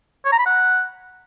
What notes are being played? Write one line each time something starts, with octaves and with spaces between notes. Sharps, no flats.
C#5
A#5
B5
F#5